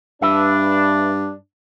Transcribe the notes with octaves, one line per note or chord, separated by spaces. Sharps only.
G2 D4 B4 E5